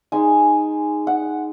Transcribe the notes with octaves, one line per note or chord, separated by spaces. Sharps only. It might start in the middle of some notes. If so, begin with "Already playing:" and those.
G#3 D#4 G#5
F#5